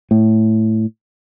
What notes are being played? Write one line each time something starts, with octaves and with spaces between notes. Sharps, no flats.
A2